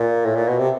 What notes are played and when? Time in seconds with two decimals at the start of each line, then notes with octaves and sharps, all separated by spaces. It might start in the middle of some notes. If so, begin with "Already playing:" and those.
Already playing: A#2
0.25 A2
0.35 A#2
0.48 B2
0.59 C3